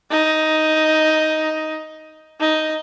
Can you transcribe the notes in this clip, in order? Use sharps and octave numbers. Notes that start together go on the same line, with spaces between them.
D#4
D#4